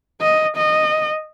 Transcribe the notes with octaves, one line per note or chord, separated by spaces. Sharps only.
D#5
D#5